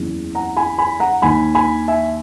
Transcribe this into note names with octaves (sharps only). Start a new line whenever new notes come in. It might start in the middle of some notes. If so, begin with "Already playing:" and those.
Already playing: F#1 E2 C#3 E3
F#5 A#5
G#5 B5
G#5 B5
F#5 A#5
D#2 D#3 G#5 B5
G#5 B5
E5 G#5